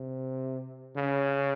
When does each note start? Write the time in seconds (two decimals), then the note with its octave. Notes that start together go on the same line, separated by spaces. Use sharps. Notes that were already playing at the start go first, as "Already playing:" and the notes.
Already playing: C3
0.96 C#3